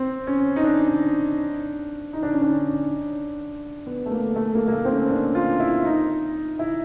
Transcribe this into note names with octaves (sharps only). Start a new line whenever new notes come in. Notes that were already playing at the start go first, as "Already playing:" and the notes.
Already playing: C4
C#4
D#4
D4
D#4
D4
C#4
D4
B3
A3
A#3
A3
A#3
A#3
A3
C4
C#4
D4
F4
E4
D#4
E4